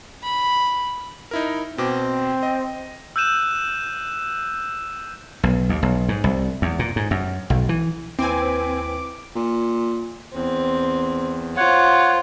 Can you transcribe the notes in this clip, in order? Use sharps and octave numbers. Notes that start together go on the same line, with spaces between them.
B5
D#4 E4 A#4
B2 C4 D6
D#5
E6 F#6 G6 D#7 E7
B1
D#2
B1
G#2
C2
E2
A#2
G#2
F#2
B1
E3
D#2 C4 E4 B4 G5 G#5 D6
A#2
E2 C4
F4 C5 C#5 F#5